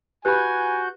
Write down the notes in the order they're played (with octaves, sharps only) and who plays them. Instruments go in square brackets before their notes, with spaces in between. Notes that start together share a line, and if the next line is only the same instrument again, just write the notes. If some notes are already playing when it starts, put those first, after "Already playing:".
[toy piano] E4 G4 B4 [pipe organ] F#4 G6 [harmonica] G#5 [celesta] B5 F#6